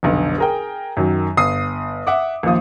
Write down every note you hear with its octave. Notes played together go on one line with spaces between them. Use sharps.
F1 B1 D3
G#4 A#4 G5
F#2 D#3 F#3
G1 D#6 C7
E5 F#5 D6
A#1 D#2 F3 D#6